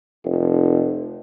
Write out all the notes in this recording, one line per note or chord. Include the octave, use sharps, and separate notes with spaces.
F1